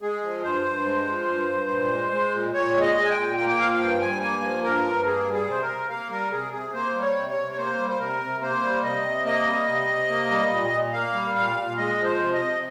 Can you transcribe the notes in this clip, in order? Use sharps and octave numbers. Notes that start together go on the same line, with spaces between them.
G#3 G#4
F3
G2 C5
G2
G#3
F3
G2
G2
A#2
G#3
G#3
A#2
A#2 C#5
G#3
D#5
G#3
G#5
G5
A#2
A#3 G5
G5
F3 F5
F5
G2 G5
G2 G#5
A#3 G#5
F3
G2 A#4
G2
A#3 G#4
G3
G#4
C3 C5
A#4
C3
A#3 F5
G3 A#4
C3 G#4
C3 G#4
A#3 C5
G3
C#5
C3
C#5
C3
C#5
A#3 C5
G3
C5
C3 A#4
C3
A#3 C5
G3
C3 D#5
C3
A#3 D#5
G3
C3
C3
A#3
G3
A#2
A#2
A#3 F5
G3
A#2 F5
A#2
G#3 D#5
F3
C5
C3
D#5
C3